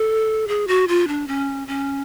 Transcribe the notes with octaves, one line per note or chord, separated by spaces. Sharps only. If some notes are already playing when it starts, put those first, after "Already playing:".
Already playing: A4
G#4
F#4
F4
D4
C#4
C#4